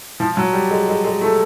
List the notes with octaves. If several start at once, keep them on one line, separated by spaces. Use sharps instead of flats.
F3
F#3
G3
G#3
G#3
G#3
A3